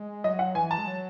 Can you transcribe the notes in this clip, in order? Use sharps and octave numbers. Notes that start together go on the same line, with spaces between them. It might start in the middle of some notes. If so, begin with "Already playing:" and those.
Already playing: G#3
F#3 D#5
F#5
E3 G#5
A5
G#3
F#3